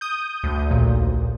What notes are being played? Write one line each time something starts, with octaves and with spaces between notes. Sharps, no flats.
D#6 G6
D2
A#1 D#2 A#2